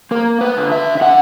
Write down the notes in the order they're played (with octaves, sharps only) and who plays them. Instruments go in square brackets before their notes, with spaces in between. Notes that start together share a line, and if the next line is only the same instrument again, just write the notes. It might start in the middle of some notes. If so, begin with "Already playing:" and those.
[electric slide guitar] A#3 A#4
B4
D3
E5
E5
D3 F#5